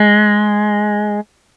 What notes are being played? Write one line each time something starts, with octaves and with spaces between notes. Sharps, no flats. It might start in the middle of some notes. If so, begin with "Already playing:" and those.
Already playing: G#3